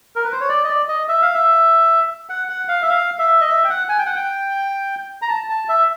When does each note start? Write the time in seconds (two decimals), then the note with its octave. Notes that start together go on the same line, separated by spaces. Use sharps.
0.16 A#4
0.24 B4
0.32 C5
0.41 C#5
0.49 D5
0.64 D#5
0.68 D5
0.89 D#5
1.08 E5
1.22 F5
1.34 E5
2.29 F#5
2.49 F#5
2.68 F5
2.82 E5
2.89 F5
3.19 E5
3.41 D#5
3.48 E5
3.64 G5
3.70 F#5
3.89 G#5
3.98 G5
4.06 F#5
4.15 G5
5.22 A#5
5.29 A5
5.49 A5
5.69 E5